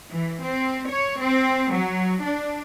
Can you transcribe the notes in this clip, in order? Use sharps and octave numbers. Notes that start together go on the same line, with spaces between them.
E3
C4
C#5
C4
F#3
D4